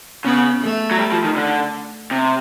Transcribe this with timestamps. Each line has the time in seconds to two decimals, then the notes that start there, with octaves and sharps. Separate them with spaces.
0.25 C#3 B3
0.62 A3
0.91 F#3
0.99 G3
1.12 F3
1.24 D#3
1.36 D3
2.11 C3